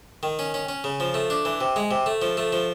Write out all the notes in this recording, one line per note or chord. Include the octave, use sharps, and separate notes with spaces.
D#3
C#4
C#4
C#4
C#3
F3
A3
D4
E3
C3
G#3
C3
A3
F3
A3
F3